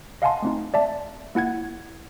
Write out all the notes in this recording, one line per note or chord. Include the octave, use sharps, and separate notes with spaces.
D#5 F5 F#5 G#5 A5 C6
A3 C4 D#4
D5 E5 A5
A#3 E4 F#5 G#6